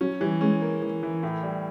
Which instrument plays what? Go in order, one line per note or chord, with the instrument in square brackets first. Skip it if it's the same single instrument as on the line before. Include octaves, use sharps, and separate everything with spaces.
[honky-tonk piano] F#3 [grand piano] C#4
[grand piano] E3 [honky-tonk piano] G3
[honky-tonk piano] G#3 [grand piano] C#4
[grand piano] A#3
E3
E3
A2
G3